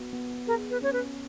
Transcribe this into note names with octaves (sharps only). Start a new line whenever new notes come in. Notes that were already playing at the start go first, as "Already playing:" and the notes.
Already playing: B3 F#4
B3
G#4 A#4
B4
C#4 C#5
B4